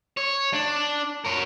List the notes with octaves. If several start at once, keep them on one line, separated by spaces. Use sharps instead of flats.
C#5
D4
A#4 C#5